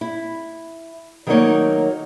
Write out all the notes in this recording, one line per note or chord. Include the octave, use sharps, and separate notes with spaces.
E4
D#3 F#3 A3 A#3 D#4 C#5